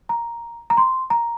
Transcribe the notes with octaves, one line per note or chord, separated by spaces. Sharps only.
A#5
A#5
C6
A#5